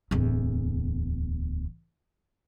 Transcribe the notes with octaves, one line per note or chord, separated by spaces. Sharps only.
D1 E2